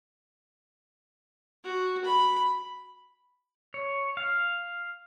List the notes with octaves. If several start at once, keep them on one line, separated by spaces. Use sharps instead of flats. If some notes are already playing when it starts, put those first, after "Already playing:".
F#4
B5
C#5
F5